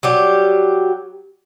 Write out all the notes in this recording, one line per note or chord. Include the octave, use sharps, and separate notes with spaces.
F#3 G3 G4